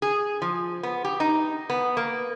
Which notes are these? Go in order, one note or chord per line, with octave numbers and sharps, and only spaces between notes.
G#4
F3
B3
G4
D#4
B3
A#3